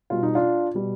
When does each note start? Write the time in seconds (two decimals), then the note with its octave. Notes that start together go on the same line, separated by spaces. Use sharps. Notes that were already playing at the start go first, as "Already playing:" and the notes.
0.10 B2 G3 F4
0.23 D#4
0.35 D4 F4
0.74 B2 G3